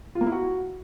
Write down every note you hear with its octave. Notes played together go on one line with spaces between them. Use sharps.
F4
A#3
E4
F#4